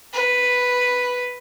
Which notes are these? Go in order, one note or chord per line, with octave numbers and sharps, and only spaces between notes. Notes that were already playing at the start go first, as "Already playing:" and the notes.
B4